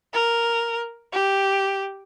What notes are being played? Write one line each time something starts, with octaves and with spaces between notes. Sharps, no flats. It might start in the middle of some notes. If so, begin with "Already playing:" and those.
A#4
G4